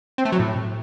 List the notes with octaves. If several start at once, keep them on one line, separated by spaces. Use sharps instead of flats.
C4
A3
F#3
A2